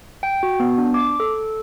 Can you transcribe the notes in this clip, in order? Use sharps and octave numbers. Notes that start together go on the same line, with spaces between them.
G5
F#4
B3
D4
D6
A4